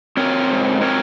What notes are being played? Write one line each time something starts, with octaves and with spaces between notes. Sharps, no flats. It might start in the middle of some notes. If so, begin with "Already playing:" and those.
C4 A#4 C#5
G#2
C4 A#4 C#5